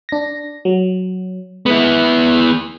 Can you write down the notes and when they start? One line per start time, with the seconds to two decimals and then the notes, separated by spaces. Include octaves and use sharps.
0.09 D4 A#6
0.65 F#3
1.66 G#3 B3 E4